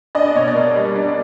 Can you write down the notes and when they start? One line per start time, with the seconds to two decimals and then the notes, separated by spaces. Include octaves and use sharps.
0.15 D4 D#5
0.26 D5
0.35 B2 C#5
0.47 D5
0.55 A#3
0.76 G3
0.95 D4